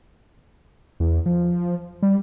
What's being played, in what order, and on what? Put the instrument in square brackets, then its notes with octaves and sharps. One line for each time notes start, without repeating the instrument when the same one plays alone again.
[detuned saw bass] E2
F3
G3